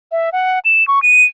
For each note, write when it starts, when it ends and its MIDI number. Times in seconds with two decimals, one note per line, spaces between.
0.12 0.29 76
0.33 0.59 78
0.65 0.86 100
0.88 1.02 85
1.02 1.23 99